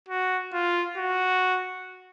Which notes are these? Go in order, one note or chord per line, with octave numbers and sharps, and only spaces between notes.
F#4
F4
F#4